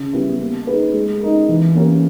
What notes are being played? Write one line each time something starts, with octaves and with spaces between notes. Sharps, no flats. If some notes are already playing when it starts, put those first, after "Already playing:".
Already playing: C#3
G3 B3 E4 G4
A#3
D#4 G#4 B4
G#3
D#4 A#4
E3
A#3 C#4 G4 A#4